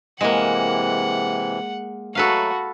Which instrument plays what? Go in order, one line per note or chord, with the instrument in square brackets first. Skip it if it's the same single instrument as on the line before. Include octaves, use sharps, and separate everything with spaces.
[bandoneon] C3 E3 [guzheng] G#3 A#3 [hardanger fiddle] F#5
[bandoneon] F#3 A3 [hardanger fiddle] F#4 [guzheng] A4 B4 F5